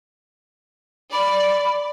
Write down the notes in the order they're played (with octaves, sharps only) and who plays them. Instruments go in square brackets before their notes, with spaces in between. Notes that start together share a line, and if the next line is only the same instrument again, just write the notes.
[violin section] D5 [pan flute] B5